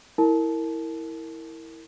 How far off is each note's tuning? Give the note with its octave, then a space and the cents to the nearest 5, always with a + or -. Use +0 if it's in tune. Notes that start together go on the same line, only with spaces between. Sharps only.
E4 -10 A#4 -20 A5 -25